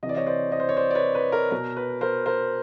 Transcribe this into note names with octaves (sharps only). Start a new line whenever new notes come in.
C3 E3 D5 D#5
C#5 D#5
C5 D5
C#5 D#5
C5
C#5
C5 D5
D5
B4 C#5
B4
A#4
B2 A#4
B4
A#4 C5
A#4 C5